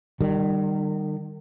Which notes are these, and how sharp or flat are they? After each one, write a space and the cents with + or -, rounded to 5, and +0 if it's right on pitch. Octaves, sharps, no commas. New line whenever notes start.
D#3 -35 G3 +0